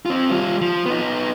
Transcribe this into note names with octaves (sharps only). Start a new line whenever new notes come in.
C4 F4
G3 F4
F3
B3 D#4